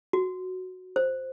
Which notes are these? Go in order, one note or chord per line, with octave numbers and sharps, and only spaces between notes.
F#4
C5